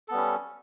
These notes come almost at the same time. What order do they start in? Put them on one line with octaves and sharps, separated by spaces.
A4 B3 G3 C#4